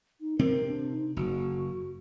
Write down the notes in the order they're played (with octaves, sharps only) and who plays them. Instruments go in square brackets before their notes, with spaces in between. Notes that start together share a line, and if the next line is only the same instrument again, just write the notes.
[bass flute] D#4
[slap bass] C3 C4 [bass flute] A#4
[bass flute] D4
D#4
[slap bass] F#1 [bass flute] F#4